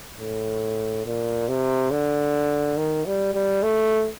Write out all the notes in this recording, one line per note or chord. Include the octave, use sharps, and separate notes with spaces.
A2
A#2
C3
D3
D#3
G3
G3
A3